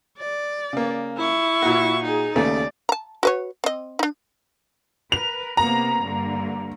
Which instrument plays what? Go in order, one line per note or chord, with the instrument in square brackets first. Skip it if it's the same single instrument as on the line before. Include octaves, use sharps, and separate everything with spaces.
[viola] D5
[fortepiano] C#3 A#3
[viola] E4 C#6
[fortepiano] A#2 F#4
[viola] D#4 G#4
[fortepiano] D#2 C#3 A3 [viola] D5
[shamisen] A5 A#5
F#4 B4 C#5
C4 D#5
D4 D#4
[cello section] A#4 B4 [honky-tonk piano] F7
[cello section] C3 A#3 B3 [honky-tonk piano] A#5
[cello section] G2 D3 A#3